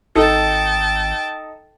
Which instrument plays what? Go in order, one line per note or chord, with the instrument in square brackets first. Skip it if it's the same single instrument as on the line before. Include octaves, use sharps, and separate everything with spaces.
[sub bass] G#1 [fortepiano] D#4 A4 [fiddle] G5 A5